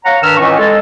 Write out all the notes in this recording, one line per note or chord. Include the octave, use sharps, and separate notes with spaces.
C#5 F5 F#5 A#5
G2 D#3 B4 A#5 E6 F6
C#2 A2 E3 C#4 D#5 C#6
G#3 A4